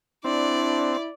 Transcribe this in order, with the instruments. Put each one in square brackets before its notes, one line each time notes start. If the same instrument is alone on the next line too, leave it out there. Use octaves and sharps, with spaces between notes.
[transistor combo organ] C4 [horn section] D4 [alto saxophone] E4 [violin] D5